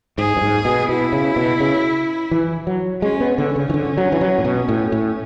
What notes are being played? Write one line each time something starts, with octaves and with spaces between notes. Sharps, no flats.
G#2 G#4
F#2
G#2
B2
B2 E4
C#3
B2
C#3
E3
F#3
G#3 C#4
B3
D3 C#4
C#3
E3
D3
F#3
E3
F#3
A2
B2
A2
A2